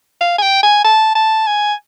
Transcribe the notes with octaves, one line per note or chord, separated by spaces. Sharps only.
F5
G#5
G5
G#5
A5
A5
G#5